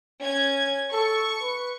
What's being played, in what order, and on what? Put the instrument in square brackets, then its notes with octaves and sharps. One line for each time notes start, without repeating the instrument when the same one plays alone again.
[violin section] C#4 G#6
[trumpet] A4 [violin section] C#6
[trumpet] B4